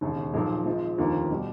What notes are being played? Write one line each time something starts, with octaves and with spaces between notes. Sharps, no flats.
E1 D#2 C#3
B1 A#2 F3 G#3
G#1 G#2 F3 G#3
F1 D#2 D3 F3 A#3
B2 G3